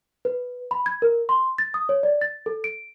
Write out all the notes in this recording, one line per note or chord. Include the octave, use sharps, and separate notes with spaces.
B4
B5
G#6
A#4
C6
A6
D#6
C#5
D5
A6
A4
D7